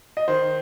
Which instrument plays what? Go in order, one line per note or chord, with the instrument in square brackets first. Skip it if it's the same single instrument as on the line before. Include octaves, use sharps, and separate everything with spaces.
[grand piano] D#5
[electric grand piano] D#3 [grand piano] C5